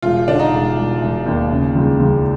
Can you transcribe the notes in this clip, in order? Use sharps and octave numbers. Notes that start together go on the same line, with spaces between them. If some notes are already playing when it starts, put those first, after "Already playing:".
E1 F4
D3 D4
D#4
E1
E1
E1
D#2
C#3
C#2
C#2